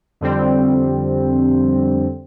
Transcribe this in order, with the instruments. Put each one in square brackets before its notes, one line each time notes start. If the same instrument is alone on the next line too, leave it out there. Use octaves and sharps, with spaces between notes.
[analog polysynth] F2 D3 G3 C4